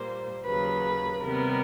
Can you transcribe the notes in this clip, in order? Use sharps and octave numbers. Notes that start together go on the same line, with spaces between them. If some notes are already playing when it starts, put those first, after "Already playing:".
Already playing: A#2 G3 A#3 C5
D#2 C#3 F#3 B4
C3 D#3 G3 B3 A#4